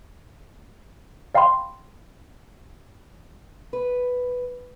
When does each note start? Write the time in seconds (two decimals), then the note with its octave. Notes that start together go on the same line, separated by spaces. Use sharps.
1.35 D5 F5 G5 B5 C6
3.73 B4